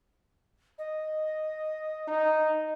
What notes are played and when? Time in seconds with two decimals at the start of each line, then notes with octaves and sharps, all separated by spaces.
0.78 D#5
2.08 D#4